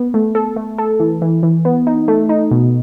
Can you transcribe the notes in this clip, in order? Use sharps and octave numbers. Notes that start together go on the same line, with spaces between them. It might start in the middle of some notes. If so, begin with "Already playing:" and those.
Already playing: B3
A3
A4
A3
A4
E3
E3
E3
B3
D#4
A3
D#4
B2